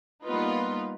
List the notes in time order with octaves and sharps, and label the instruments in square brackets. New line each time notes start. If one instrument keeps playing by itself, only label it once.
[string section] G3 A#3 B3 D#4 F4 B4